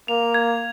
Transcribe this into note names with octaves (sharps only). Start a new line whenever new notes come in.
A#3 F7
G#6